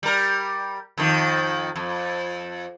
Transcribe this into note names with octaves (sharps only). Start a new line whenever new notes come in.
G3 A#4
F2 D#3
F2